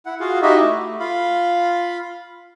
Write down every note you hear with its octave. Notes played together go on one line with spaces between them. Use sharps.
E4 F#5
F4 F#4 G#4 F5
D#4 E4 F#4 G4 D#5 E5
A3
F4 F5 B5